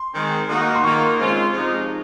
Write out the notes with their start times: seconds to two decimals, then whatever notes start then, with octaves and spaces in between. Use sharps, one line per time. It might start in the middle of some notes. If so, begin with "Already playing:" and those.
Already playing: C6
0.14 D#3 G#3 C4
0.49 D#3 A#3 D#4 F#4
0.75 C6
0.84 D#3 A#3 F4 C#6
1.19 C#3 G#3 C4 F4
1.54 C3 F3 G#3 D#4